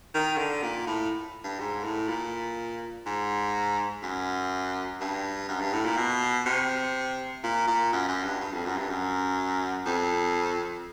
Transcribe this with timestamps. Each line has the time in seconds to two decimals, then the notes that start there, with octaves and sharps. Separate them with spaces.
0.14 D#3
0.38 D3
0.63 A#2
0.87 A2
1.44 G2
1.60 G#2
1.84 A2
2.09 A#2
3.06 G#2
4.03 F#2
5.01 G2
5.48 F#2
5.60 G2
5.73 A2
5.85 A#2
5.97 B2
6.46 C3
7.44 A#2
7.67 A#2
7.93 F#2
8.08 F#2
8.25 G2
8.41 G2
8.52 F2
8.66 F#2
8.77 G2
8.90 F#2
9.86 F2